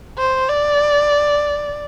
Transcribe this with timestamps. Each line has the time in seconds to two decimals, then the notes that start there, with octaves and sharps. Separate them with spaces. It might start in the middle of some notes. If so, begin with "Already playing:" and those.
0.18 C5
0.49 D5